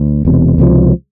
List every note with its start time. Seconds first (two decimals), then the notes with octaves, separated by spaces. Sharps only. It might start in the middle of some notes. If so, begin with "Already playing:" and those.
Already playing: D2
0.25 E1 E2 C3
0.58 C#2 C3 F3